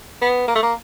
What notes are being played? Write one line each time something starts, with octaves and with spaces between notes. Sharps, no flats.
B3
A#3
A3
A#3